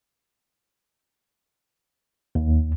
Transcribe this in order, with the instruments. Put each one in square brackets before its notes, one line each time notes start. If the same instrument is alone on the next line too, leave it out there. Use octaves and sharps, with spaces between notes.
[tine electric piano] D#2